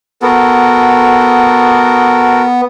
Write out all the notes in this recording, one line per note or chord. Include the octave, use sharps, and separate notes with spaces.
B3 F#4 A4 A#4